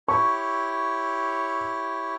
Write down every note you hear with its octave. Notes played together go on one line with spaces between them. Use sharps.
E4 G4 C#5 C#6